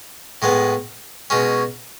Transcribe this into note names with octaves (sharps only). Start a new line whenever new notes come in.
A2 G#3 B3
B2 G#3 C#4